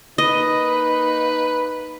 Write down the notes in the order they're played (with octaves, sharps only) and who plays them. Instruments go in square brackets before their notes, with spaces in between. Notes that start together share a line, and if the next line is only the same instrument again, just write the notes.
[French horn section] A#3 D#4 [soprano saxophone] B4 [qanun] D#5